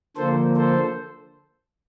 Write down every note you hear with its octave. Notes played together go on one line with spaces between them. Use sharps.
D3 F3 A#3 A4 C5
A4 C5